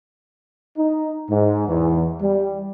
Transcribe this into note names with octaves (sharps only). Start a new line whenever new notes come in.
D#4
G#2
E2
G3